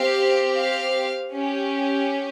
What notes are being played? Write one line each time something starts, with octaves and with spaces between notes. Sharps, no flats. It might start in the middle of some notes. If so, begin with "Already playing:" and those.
Already playing: C4 G4 F5
F5
C#4 G4